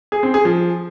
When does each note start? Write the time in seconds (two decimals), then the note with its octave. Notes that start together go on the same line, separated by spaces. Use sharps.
0.12 G#4
0.23 C4
0.34 G#4
0.45 F3